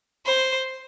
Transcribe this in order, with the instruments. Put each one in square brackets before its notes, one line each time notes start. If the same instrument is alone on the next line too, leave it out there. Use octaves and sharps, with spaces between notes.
[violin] C5